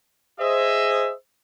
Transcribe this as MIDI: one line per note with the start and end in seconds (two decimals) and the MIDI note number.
0.40 1.11 68
0.40 1.11 72
0.40 1.11 75
0.40 1.11 76